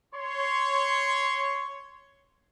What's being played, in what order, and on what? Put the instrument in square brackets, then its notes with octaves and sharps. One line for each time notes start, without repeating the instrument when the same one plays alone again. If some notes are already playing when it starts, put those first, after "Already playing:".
[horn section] C#5 C6